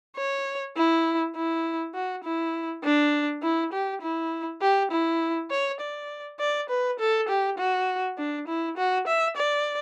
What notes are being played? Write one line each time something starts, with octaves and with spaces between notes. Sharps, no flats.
C#5
E4
E4
F#4
E4
D4
E4
G4
E4
G4
E4
C#5
D5
D5
B4
A4
G4
F#4
D4
E4
F#4
E5
D5